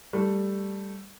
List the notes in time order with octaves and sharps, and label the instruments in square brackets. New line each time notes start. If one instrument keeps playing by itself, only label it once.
[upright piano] G3 A3